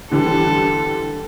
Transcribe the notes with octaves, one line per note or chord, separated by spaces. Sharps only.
D3 E3 G3 A4